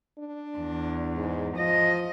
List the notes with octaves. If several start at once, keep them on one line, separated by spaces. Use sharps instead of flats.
D4
E2
G#2
F3 D#5